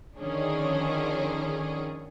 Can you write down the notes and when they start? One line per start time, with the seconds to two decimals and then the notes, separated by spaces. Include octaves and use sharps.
0.18 D3 D#3 F3 C#4 D4 G#4